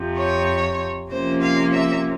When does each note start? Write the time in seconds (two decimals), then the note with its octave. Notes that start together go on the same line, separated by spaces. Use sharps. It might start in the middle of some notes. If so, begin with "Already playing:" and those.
Already playing: F2 C3 F3
0.18 C#5
1.11 C3 F3 A#3 C#4 C5
1.41 F5
1.72 E5